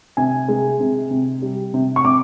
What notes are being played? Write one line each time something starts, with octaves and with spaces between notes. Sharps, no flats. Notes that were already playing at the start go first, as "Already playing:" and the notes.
C3 G#5
G#3
C3
C3
G3
C3
C#6
C3 D6